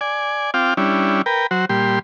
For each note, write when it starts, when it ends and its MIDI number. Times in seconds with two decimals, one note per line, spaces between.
0.01 0.51 74
0.01 0.51 80
0.54 0.74 60
0.54 0.74 65
0.54 0.74 77
0.54 0.74 79
0.54 0.74 86
0.77 1.22 55
0.77 1.22 61
0.77 1.22 62
0.77 1.22 64
1.26 1.47 70
1.26 1.47 71
1.26 1.47 79
1.51 1.65 54
1.51 1.65 66
1.51 1.65 72
1.69 1.99 46
1.69 1.99 55
1.69 1.99 67
1.69 1.99 84